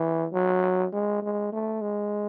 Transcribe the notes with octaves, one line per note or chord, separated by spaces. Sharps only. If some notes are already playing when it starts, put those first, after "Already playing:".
Already playing: E3
F#3
G#3
G#3
A3
G#3